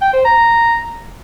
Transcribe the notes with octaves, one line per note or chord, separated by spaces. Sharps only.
G5
C5
A#5